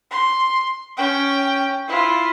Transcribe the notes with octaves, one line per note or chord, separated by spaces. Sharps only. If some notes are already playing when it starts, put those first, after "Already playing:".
C6
C#4 G5
E4 F4